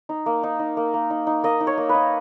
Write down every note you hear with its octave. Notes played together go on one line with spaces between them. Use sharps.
D#4
A#3
D#4
D#4
A#3
A#3
D#4
D#4
A#3 D#5
D#4
C#5
A#3
B4
D#4